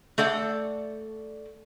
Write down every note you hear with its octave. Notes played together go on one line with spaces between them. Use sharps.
A3 A4 D5 F#5